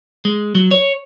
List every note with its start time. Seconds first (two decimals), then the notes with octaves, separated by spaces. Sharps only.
0.25 G#3
0.55 F#3
0.71 C#5